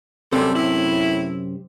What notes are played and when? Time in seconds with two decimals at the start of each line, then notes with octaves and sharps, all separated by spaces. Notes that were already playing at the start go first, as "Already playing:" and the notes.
0.33 F#2 C3 G3 A4
0.56 A2 E4